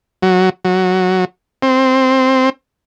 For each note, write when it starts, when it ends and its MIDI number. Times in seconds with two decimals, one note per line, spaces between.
0.22 0.50 54
0.65 1.25 54
1.62 2.50 60